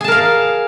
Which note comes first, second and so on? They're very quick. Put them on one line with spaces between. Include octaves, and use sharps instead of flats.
G#4 A5 A#4 F5